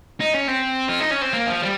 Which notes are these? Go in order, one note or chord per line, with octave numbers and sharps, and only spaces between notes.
D#4
C#4
C4
F4
D#4
C#4
C4
A#3
F3
G3